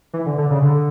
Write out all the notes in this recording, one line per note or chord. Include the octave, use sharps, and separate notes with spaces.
E3
D3
D3
C#3
D3